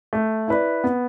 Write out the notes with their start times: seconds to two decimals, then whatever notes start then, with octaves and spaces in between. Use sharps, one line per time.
0.13 A3
0.48 E4 B4 D5
0.84 B3